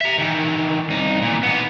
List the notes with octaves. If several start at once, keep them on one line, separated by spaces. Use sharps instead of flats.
E5 A#5
D#3 E3
C2 D#4
A#2 E3
B3 D#4